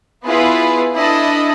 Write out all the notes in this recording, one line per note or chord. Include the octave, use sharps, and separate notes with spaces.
B3 E4 F4 G#4 B4
D4 E4 A4 D#5